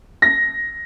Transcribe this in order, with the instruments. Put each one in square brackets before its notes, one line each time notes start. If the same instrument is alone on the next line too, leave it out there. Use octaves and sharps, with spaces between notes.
[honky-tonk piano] A#6